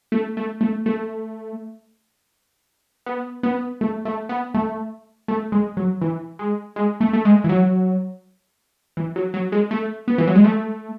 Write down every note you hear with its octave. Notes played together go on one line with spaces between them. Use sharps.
A3
A3
A3
A3
B3
B3
A3
A3
B3
A3
A3
G#3
F#3
E3
G#3
G#3
A3
A3
G#3
E3
F#3
E3
F#3
F#3
G#3
A3
B3
E3
F#3
G#3
A3